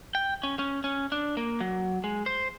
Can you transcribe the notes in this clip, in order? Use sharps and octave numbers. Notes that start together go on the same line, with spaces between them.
G5
C#4
C#4
C#4
D4
A#3
F#3
G#3
C5